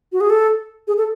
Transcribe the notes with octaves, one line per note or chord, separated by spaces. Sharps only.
F#4
G#4
A4
G#4
A4